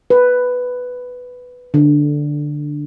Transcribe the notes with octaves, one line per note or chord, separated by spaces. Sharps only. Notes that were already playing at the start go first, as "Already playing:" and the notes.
B4
D3